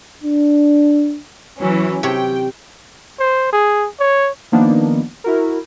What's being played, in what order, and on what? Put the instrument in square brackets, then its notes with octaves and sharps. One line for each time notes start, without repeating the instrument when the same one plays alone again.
[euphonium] D4
[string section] E3 F#3 C#4
[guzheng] C3 C#5 [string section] G5
[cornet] C5
G#4
C#5
[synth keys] D#3 F3 A#3 B3 D4 D#4
E4 F#4 A#4